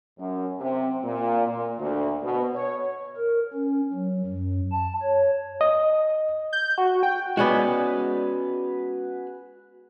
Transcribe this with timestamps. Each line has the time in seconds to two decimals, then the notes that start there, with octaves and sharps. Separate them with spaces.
0.19 F#2
0.60 C3
1.04 A#2
1.47 A#2
1.79 D2
2.23 B2
2.55 C#5
3.17 A#4
3.53 C#4
3.93 F#3
4.26 F#2
4.72 A5
5.02 C#5
5.61 D#5
6.53 G6
6.78 F#4
7.03 G5
7.37 G#3 B3 C#4 F#4 G#4 B4 D5 F#5